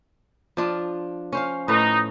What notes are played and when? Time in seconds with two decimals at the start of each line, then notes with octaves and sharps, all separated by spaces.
0.57 F3 D4 F4
1.32 C#4 C5 F5
1.68 A2 D#4 B4